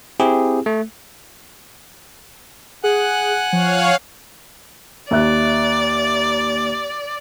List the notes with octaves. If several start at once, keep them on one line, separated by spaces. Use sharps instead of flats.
C4 E4 G4 G#4
A3
G#4 F#5 G#5 F#6
F3 C#5 F5
D#2 D5 E5 F#6